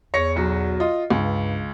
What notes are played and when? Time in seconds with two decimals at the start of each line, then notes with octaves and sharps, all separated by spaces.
0.14 E2 C#5 A#6 C#7
0.36 B1 F#3
0.80 F4 D#5
1.10 C#2 G2